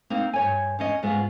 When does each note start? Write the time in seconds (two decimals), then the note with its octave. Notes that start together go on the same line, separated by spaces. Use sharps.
0.10 A#3 C4 D#4
0.33 G2 C#5 G#5
0.79 E2 C#4 D#5
1.03 G#2 G#3 B3 C#4 F4